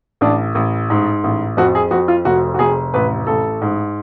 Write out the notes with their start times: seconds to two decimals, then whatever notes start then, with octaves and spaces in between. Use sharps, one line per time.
0.21 A1 D4
0.55 A1
0.90 G#2
1.24 A1
1.57 F2 F#4
1.75 G#4
1.91 F2 F#4
2.08 F4
2.25 F1 F#4
2.54 F#4
2.59 F1 G#4
2.94 A1 B4
3.27 A1 A4
3.61 G#2